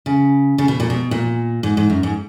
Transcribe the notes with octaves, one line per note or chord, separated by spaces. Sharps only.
C#3
C#3
B2
A#2
B2
A#2
G#2
G#2
F#2
G#2